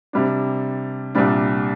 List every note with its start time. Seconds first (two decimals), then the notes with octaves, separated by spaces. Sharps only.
0.13 C3 G3 D4
1.15 C2 A#2 G3 D4